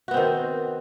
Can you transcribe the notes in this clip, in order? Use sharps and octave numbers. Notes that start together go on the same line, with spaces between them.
D#3 B3 C4 F#4